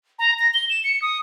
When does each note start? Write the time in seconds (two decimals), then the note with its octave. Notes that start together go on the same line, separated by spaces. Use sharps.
0.19 A#5
0.39 A#6
0.54 G7
0.70 E7
0.84 C#7
1.02 D#6